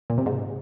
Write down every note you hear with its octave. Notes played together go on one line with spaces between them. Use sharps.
A#2
C3
G#2